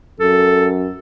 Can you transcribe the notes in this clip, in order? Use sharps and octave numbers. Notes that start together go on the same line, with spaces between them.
F#2 A4